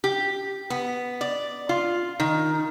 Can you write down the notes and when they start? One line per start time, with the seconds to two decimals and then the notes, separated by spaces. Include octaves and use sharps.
0.04 G4
0.70 B3
1.21 D5
1.69 F4
2.20 D#3